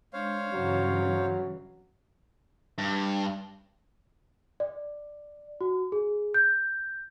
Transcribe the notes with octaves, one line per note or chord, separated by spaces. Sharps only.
G#3 D4 C5 C#5 F5
G2 C#3 E3 F#3
G2
D5
F#4
G#4
G6